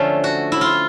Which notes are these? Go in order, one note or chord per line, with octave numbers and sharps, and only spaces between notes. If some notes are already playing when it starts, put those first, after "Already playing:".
Already playing: D3 F3 A3 C#4
F#4
E4
F4